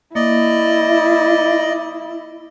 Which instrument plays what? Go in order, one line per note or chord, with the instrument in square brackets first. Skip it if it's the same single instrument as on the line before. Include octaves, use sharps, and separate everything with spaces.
[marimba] A#3 [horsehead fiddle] E4 [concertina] D5 D#5